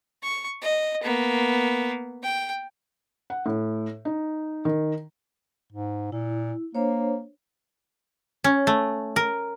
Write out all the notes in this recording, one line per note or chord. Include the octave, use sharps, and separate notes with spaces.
C#6
D#5
A#3 B3
G5
F#5
A2
D#4
D#3
G#2
A#2 E4
A#3 D4 C5 C#5
C#4
A3
A#4